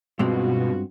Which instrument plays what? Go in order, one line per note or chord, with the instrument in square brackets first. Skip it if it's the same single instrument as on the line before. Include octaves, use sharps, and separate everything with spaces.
[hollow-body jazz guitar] G2 G#3 C4 [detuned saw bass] B2 [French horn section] B3 F4 F#4